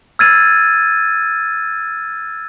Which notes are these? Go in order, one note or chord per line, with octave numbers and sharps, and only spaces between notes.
E6 F6 G#6 A6 D#7